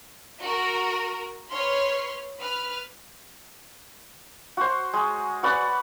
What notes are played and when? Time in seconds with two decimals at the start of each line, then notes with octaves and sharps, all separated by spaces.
0.42 F#4 A#4
1.52 B4 C#5 C6 F6
2.39 B4 F6
4.57 F#4 C5
4.93 G#3
5.43 F#4 B4 D5 F#5